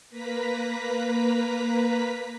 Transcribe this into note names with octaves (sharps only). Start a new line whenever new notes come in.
A#3 B4 A#5 B6